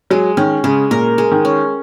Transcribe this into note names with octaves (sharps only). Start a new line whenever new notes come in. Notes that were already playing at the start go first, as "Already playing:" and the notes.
F#3 G#3
D#3 C#4
C#3 G#3
A#2 A#4
G#3
D#3
C#4